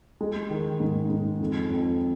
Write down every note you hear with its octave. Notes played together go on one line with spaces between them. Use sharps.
G#3
D#3
G#2
G#2
F2
F2